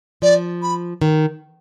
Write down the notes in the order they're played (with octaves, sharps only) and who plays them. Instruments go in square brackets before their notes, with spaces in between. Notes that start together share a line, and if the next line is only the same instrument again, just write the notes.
[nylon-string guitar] F3 [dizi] D5
[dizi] B5
[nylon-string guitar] D#3